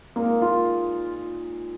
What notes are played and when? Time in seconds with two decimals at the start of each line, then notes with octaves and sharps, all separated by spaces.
0.16 A#2 G#3 A#3 D#4
0.42 F4